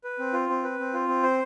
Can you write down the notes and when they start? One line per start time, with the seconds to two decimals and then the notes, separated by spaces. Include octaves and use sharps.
0.04 B4
0.19 C4
0.33 F4
0.49 C4
0.64 B4
0.79 C4
0.94 F4
1.08 C4
1.23 C5